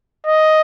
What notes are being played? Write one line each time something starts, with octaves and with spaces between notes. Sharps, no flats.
D#5